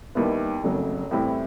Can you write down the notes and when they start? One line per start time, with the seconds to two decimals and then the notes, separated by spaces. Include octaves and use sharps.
0.15 D#2 D#3 G3 B3 E4
0.63 F#1 F2 C#3 F#3 A3
1.11 A2 E3 G3 C4 E4